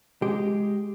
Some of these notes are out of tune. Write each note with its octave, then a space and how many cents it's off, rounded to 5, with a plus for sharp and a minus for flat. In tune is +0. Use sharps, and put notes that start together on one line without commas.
G#3 +0 G4 +0